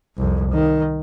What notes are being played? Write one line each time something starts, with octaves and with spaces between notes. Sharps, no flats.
C2 F2
D#3